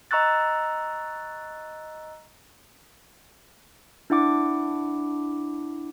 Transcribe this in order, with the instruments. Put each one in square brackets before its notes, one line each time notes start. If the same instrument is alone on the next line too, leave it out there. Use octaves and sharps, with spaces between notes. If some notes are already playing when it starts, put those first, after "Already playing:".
[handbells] D#5 A#5 C#6 E6 F#6 A6
D4 E4 F#5 D6